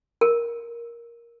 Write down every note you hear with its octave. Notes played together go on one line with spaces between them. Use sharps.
A#4